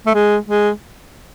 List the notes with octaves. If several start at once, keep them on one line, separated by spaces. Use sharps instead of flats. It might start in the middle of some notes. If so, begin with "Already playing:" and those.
A3
G#3
G#3